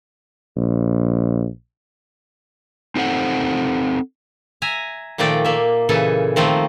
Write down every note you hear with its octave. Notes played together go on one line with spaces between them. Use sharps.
A#1
C4 D#4 A4 C5 E5 F#5
E5 G#5 A#5
A#2 D#3 F3 A3 D5 G5
A#3 E5
A#2 C#3 E3 A4 G#5
D#3 F3 A3 A#3 C4